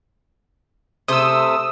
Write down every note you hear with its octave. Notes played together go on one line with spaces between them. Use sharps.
C3 A3 C5 D#6 E6